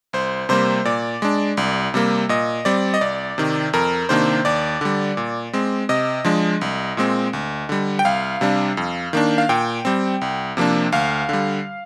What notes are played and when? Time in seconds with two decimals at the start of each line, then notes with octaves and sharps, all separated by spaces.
0.13 C2 C5
0.49 C3 G3 A#3 C5
0.85 A#2 D5
1.22 G#3 D4
1.57 C2
1.94 C3 G3 A#3
2.29 A#2 D#5
2.65 G3 C4 D5
2.94 D#5
3.01 C2 D5
3.38 C3 D#3
3.73 F2 A#4
4.09 C3 D#3 A#3 D4 C5
4.45 D#2 D5
4.81 D3 G3
5.17 A#2
5.53 G#3 C4
5.89 C3 D#5
6.25 F3 G#3 D4
6.61 C2
6.97 A#2 G#3 C4
7.33 D2
7.69 D3 G3
7.99 G5
8.05 C2 F5
8.41 C3 G3 D4
8.77 F2
9.13 D#3 A#3 D4
9.38 F5
9.49 A#2 G5
9.85 G3 C4
10.21 C2
10.57 C3 F3 A#3 D4
10.92 D2 F5
11.29 D3 G3